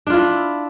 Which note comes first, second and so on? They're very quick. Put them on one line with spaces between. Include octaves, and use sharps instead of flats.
D4 F4 E4